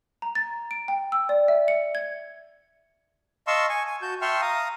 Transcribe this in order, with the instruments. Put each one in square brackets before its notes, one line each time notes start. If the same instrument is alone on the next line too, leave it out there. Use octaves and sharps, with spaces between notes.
[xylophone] A#5
A6
D7
G5
E6
D5
E5
C#7
G#6
[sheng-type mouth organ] D#5 F5 A5 C6 C#6 E6
G#5 C#6
G#5
F#4 A5 G6
E5 G5 A5 C6 C#6 F6
F5 A#5 D#6